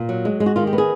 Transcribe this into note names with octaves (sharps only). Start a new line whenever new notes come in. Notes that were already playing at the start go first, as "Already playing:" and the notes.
Already playing: A#2
F#3
G#3
G#3
F#4
D#3 F4
G4
B3
G#4